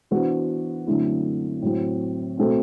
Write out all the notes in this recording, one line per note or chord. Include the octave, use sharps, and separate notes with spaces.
E3 B3 D4 F#4 C5
F#2 D3 A3 C4 E4
A2 F#3 C4
B2 A3 C4 F#4 A4